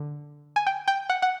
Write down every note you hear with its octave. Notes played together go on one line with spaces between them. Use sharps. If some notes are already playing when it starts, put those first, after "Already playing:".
Already playing: D3
G#5
G5
G5
F#5
F#5